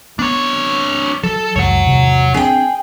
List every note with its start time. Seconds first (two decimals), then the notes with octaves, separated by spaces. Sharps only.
0.19 B3 D4 C#5
1.23 F#3 A4
1.56 C#2 F#2 G3 C#5 F#5
1.85 E2 C3 D#3
2.34 C4 D4 G#4 G5